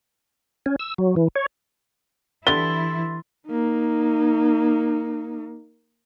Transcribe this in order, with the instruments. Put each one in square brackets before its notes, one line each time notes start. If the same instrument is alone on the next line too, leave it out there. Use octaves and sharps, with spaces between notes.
[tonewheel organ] C#4
E6
F#3
E3
C#5
[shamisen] D3 G3 [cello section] E3 E4 [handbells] C6 A6 [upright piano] G7
[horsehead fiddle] A#3 D#4